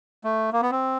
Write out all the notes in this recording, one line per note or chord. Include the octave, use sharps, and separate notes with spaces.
A3
A#3
B3
C4